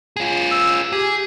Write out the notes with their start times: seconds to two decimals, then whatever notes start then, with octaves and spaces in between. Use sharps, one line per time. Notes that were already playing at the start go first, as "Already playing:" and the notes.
0.17 F4 G#4
0.51 E6
0.92 G4 G#4